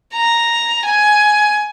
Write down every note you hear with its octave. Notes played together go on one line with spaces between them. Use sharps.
A#5
G#5